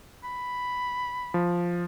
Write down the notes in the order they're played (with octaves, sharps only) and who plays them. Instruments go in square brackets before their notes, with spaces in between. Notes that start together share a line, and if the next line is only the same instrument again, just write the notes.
[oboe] B5
[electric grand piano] F3